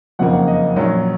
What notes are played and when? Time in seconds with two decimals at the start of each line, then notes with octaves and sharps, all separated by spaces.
0.19 F#1 F2 C#3 F3 A#3 F#5
0.33 F#5
0.47 D#5
0.76 A#1 A#2 F#3 C#4 C#5